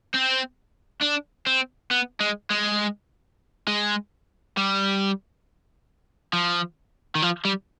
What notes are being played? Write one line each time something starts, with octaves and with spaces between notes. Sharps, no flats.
C4
D4
C4
B3
G#3
G#3
G#3
G3
F3
D#3
F3
G3